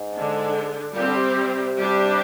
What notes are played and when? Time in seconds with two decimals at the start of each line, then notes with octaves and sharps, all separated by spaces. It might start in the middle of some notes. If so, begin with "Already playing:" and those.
Already playing: G#2
0.13 D3 G#3 D4
0.95 A#2 G3 C4 G4
1.07 D3
1.16 C3
1.36 C3
1.78 G3 D4 G4